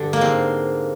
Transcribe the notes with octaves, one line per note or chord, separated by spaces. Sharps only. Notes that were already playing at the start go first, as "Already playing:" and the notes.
Already playing: G2 D3
A#3
G#2 C4